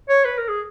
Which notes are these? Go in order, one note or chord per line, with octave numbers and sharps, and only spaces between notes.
C#5
B4
A#4
G#4